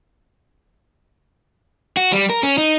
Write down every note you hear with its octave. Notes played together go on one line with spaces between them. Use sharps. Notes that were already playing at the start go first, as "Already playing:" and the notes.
F#4
G3
A#4
C#4
D#4